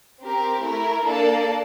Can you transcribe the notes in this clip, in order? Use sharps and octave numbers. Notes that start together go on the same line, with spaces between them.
C4 G4 A#4
A3 E4 A#4
A#3 D4 A4 D5 A5